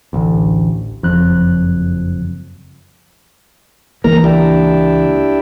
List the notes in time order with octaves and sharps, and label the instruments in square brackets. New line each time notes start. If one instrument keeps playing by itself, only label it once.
[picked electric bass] A1 D2
[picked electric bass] F#1 F2 [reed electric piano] F3 F#6
[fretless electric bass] C#2 E3 A#3 [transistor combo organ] A#4 A#5
[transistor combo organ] D4 E4 G4